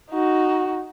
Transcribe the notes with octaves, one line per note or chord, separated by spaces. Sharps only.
D#4 F#4